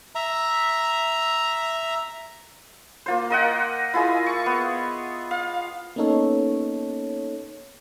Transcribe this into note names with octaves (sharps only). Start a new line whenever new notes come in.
E5 A#5
A#3 F4 C5
A#4 D#5 F#5 G5
E4 F4 G#4 D#5
C#6
B3
F5
A#3 B3 C#4 D#4 A4 C#5